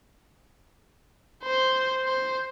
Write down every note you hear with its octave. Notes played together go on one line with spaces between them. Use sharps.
C5
C5